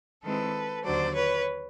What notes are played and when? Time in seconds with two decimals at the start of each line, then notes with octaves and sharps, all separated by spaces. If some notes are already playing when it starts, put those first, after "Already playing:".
0.23 D#3 G#3 C4 E4 A4 B4
0.84 D#2 D3 F#3 C5 D5
1.14 B4 C#5